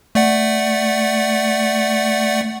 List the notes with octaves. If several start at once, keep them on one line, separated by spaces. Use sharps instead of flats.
A3 D5 F#5